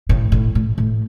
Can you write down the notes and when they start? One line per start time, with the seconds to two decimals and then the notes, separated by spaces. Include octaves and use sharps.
0.09 A2
0.32 A2
0.55 A2
0.78 A2